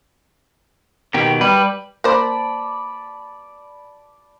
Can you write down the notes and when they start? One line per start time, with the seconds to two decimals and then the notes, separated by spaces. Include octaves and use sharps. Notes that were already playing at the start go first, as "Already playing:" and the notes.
1.14 B2 D#3 G4
1.41 G3 B4
2.04 A#3 C5 D5 A5 B5